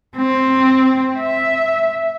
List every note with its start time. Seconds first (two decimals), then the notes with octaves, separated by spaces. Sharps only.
0.16 C4
1.20 E5